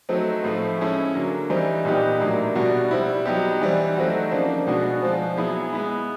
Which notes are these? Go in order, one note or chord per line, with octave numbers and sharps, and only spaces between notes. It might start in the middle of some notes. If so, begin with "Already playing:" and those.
F#3 A3 C4 D#4
A2 F3 A3
G#3 C#4 E4 A4
D3 F#3 A#3
E3 G3 C4 D#4
A#2 G3 B3 D#4 G4
A2 F#3 A#3 D4
B2 G3 B3 D4 F#4
G3 C4 E4
F#3 B3 D#4 G4
E3 G3 C4
F#3 A3 C4 D#4 F#4
C#3 F3 A#3 D4
B2 G#3 B3 D4 F#4
F3 G#3 C4
F#3 B3 E4 G#4
G#3 B3 E4